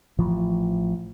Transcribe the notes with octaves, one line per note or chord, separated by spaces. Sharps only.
A1 E3 F3